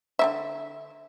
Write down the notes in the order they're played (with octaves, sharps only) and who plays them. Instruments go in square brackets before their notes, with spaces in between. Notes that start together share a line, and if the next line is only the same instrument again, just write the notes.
[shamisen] D3 A#3 E5